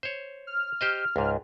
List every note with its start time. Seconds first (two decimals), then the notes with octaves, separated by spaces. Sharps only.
0.03 C5 C#5
0.47 F6
0.81 G4 C5 D#5
1.16 C#2 G#2